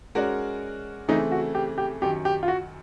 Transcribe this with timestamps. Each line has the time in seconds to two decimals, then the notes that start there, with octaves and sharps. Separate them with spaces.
0.15 G#3 C#4 F#4 A#4 D5
1.08 C#3 E3 A3 C4 D#4
1.31 F#4
1.55 G4
1.78 G4
2.02 F#2 D#3 F#3 G4
2.25 G4
2.43 F4
2.48 F#4